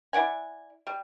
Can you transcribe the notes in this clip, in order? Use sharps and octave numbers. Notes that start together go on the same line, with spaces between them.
E4 D5 F#5 G#5
G3